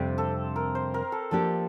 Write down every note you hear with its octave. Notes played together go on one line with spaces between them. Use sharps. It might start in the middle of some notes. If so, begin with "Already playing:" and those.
Already playing: F2 C3 G3 C4 D4
A4
A#4
C5
A#4
A4
F3 A#3 D4 G4 A4